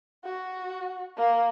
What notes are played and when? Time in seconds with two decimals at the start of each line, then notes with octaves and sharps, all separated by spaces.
0.24 F#4
1.18 A#3